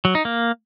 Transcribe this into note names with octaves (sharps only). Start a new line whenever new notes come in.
F#3
D#4
A#3